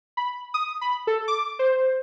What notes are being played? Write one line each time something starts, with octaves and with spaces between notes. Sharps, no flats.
B5
D#6
B5
A4
D6
C5